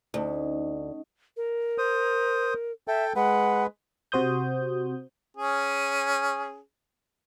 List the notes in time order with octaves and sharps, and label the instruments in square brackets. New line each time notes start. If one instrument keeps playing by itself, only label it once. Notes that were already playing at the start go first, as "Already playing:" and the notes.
[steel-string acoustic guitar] D2 [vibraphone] C#4 D#4 D#5
[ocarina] A#4
[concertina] C5 D#6
[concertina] A4 G5 [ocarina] E5
[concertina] G#3 B4 [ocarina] F#5
[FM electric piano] C3 F#4 C5 D#6 G6
[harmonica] C#4 G#4